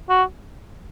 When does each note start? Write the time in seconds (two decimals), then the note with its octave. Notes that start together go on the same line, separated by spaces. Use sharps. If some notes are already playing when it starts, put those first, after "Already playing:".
0.09 F#4